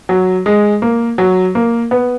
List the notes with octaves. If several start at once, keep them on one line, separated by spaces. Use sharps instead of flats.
F#3
G#3
A#3
F#3
A#3
B3